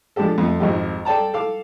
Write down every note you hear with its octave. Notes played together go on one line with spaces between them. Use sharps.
F3 G#3 D4 G4 A4
F2 A3
G#1 F2 G4
A4 D5 G5 A5 A#5
A4 F5 D6